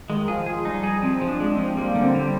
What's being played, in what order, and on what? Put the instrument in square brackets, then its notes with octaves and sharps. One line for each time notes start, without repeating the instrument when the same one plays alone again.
[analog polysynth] D#3 [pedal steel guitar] G#3
[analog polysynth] F3 [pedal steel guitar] G#4
[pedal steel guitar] G#4
[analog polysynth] G3 [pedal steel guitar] D#4
[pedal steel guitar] G#4
[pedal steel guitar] F3 [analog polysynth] C4
[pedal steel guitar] F3
[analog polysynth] D4
[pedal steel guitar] G#3
[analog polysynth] C4
[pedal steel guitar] F3
[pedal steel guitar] G3 [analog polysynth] A#3
[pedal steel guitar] D3
[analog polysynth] C4
[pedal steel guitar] G3